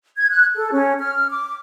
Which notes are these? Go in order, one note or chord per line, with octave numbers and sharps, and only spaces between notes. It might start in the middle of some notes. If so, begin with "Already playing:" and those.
G#6
F#6
A4
C#4
F6
D6